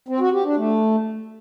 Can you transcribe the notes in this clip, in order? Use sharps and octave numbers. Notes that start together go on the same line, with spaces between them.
C4
F#4
G4
D4
A3